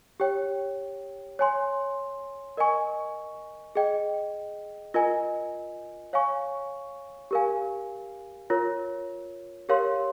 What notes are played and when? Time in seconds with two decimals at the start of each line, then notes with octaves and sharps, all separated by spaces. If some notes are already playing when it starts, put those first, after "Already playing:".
0.20 G4 C#5 G5
1.39 C#5 G#5 C6
2.57 A#4 D#5 G#5 C#6
3.75 G#4 D#5 G5
4.94 F4 A#4 D#5 G#5
6.13 C#5 F5 G#5 C#6
7.31 G4 A#4 F5 G#5
8.50 F4 A#4 C#5
9.69 G4 A#4 C#5 F5 C6